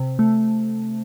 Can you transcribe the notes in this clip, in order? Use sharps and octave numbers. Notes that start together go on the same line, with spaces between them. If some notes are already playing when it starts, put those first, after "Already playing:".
Already playing: C3
A3